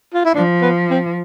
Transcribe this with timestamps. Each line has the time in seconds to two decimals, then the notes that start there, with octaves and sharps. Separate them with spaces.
0.14 F4
0.25 E4
0.34 F3 D4
0.62 B3
0.90 C4